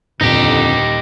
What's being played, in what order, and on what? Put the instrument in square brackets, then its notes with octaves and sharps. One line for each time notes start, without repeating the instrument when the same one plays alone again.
[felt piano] D#1 [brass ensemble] F2 D3 [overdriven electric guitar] D#4 G4